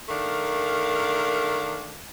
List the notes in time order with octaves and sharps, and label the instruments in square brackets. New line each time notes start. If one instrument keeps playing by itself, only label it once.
[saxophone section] D#3 A3 D4 A#4 F5